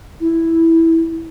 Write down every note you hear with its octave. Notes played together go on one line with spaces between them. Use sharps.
E4